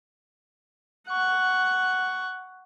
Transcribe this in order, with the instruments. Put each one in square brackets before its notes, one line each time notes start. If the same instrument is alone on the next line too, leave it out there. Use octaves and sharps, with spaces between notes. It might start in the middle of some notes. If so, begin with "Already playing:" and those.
[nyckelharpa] F#5 C#6